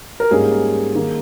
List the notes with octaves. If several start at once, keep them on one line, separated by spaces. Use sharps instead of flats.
A#4
G#2 G3 A#3 C#4 G#4
D#3 A#3